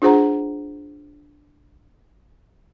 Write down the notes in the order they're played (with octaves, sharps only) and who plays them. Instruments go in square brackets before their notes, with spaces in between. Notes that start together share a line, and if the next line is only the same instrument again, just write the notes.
[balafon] D4 F4 G#4 C5 F#5 A#5